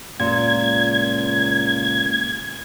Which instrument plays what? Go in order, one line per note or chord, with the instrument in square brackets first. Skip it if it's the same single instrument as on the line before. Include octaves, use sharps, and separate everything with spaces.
[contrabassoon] C#2 [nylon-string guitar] A#2 [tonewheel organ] G#6